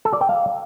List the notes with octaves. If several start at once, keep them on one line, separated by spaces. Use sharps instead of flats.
A4
D5
G5
F5